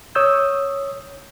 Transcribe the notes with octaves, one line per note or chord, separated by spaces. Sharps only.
C#5 D#6 E6 G6